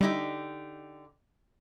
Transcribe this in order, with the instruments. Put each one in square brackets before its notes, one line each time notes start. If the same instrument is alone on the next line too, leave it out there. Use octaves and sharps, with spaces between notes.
[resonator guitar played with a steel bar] D3 D#4 G4 [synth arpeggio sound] G3 E4